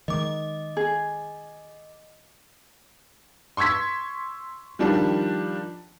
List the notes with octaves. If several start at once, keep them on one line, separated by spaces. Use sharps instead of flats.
D#3 G#3 D#5 D6
G#4
C6 C#6 E6 G#6 B6
D#3 F3 G3 D4